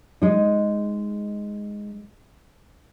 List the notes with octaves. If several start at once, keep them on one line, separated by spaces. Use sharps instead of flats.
G#3 D#4